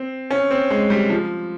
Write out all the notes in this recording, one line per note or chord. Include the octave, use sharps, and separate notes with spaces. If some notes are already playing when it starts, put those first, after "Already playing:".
Already playing: C4
C#4
C4
G#3
G3
F3